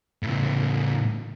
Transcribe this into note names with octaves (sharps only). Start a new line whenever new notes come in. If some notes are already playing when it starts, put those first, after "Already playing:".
A2 C#3